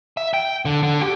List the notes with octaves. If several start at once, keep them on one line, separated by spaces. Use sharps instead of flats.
E5
G5
D3
D3
G4